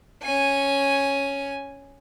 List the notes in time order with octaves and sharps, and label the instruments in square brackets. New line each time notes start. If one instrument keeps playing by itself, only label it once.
[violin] C#4 G#5